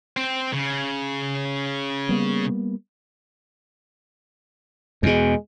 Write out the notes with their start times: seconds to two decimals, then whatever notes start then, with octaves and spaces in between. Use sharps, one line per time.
0.17 C4
0.53 C#3
2.09 G3 A#3 B3
5.03 E2 B2 G#3